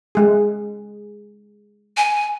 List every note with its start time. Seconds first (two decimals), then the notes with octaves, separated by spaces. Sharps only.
0.15 G#3 G#4
1.97 G#5